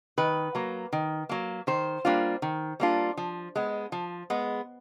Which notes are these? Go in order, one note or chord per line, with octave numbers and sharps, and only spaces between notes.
D#3 B4
F#3 A#3
D#3
F#3 A#3
D#3 C5
G3 A#3 D4 F4
D#3
G3 A#3 D4 F4
F3
G#3 B3
F3
G#3 B3